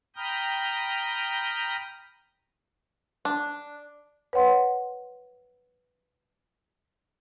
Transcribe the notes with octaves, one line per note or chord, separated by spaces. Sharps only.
G5 A#5 B5 D#6 F6 G6
D4
B4 C#5 F#5 C6